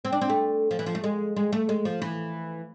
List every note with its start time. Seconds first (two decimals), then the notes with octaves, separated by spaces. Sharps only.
0.05 C4
0.12 D4
0.21 C4
0.30 A3
0.71 F3
0.79 E3
0.86 F3
0.95 A3
1.04 G#3
1.36 G#3
1.52 A3
1.69 G#3
1.85 F3
2.02 E3